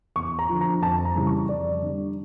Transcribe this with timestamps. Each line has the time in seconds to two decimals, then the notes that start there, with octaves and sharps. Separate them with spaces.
0.16 E2 C#6
0.39 A#5
0.49 D3 F3
0.61 A#5
0.82 F2 A5
1.05 A#5
1.16 C#3 E3 G3
1.27 C#6
1.49 F2 D5
1.82 D3 G3